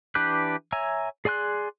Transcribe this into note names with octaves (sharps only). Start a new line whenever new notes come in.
E3 D4 G4 B4 F#6
C#5 E5 G#5 A#5
G#4 D5 G#5 C6 F#6